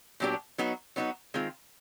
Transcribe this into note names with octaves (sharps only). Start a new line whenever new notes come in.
A#2 F#3 B3 D4 G4
F#3 B3 D#4 F#4
F#3 B3 D#4 F#4
D#3 G#3 C4 F4